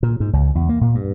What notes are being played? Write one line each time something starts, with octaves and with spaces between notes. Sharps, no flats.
A#2
G#2
C#2
E2
A#3
A#2
G2